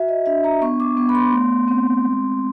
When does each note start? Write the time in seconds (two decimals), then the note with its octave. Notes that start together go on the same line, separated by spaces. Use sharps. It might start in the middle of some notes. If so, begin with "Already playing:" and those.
Already playing: F#4 E5
0.08 D#5
0.26 D4 E5
0.44 A#5
0.62 B3 C#6
0.80 D6
0.97 B3
1.09 B5
1.15 C6
1.33 A3
1.68 C4
2.04 G#3